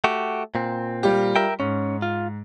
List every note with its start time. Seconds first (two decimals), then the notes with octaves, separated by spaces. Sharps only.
0.04 A3 F#4 G4
0.55 A#2 C4
1.03 G3 F4 G4
1.36 A#4 E5 G5
1.60 G#2 C#4
2.02 F4